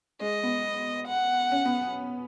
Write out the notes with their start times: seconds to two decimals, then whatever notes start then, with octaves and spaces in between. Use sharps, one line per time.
0.21 G#3 D#5
0.43 B3
1.07 F#5
1.51 C#4
1.65 B3